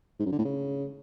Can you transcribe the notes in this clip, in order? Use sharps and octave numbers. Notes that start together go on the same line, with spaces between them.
G#2
F#2
D3
A2
C#3